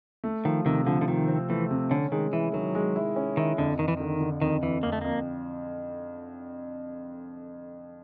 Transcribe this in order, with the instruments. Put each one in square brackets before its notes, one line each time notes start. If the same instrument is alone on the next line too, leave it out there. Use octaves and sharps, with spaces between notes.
[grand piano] A3
[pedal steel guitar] D#3 [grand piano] F3
[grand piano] C3 [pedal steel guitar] D#3
[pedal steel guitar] D3 [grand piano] F3
[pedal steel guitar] D3
[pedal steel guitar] D#3 [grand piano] F3
[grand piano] C4
[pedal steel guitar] E3 [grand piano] A3
[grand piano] C3
[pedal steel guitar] D3 [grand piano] C#4
[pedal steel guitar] D#3 [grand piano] G#3
[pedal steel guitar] E3 [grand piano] E4
[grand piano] D#3 [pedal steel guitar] F#3
[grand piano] G#3
E4
C#4
[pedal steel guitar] D#3 [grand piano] E4
[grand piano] F2 [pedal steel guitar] D3
[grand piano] F2 [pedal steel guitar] D#3
[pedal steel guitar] E3
[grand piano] D3 [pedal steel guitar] D#3
[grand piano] D3
[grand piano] F2 [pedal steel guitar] D#3
[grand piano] F2 [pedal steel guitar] E3
[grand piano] F2 [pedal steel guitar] A#3
[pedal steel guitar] A3
[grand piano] F2 [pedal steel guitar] A#3